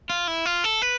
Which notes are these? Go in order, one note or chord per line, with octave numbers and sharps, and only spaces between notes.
F4
E4
F4
A4
B4